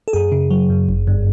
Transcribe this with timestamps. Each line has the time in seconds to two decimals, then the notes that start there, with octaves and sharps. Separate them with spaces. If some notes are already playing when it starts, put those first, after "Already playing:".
0.08 A4
0.13 F#2 G#4
0.32 C#3
0.51 F#3
0.70 F#2
0.89 G1
1.07 G2